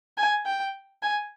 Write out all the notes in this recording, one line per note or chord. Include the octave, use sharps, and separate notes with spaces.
G#5
G5
G#5